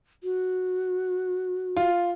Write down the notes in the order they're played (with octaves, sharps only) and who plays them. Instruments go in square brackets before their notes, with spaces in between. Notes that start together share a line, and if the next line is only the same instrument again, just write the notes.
[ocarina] F#4
[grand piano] F4